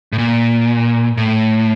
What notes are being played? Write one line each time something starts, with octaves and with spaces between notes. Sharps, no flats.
A2
A#2
A2